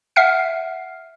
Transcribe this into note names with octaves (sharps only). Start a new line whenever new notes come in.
E5 F#5 F6 C7